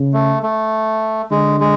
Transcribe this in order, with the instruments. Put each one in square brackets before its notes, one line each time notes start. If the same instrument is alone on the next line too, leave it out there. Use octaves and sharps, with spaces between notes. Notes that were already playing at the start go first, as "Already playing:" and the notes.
Already playing: [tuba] C#3
[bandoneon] A3
A3
[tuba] D3 [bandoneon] G#3
[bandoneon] G#3